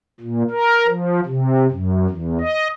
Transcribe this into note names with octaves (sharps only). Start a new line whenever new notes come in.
A#2
A#4
F3
C3
F#2
E2
D#5